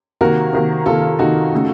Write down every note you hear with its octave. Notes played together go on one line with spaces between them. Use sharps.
C3 D#3 A#3 F#4 A#4
C3 D#3 A#3
C3 D#3 A#3 F4 A4
C3 D#3 A#3 D#4 F#4
C#3 A3